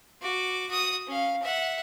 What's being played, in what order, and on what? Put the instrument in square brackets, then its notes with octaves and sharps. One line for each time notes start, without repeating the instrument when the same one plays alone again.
[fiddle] F#4 D6
F#4 D#6
C#4 F5
E5 F#5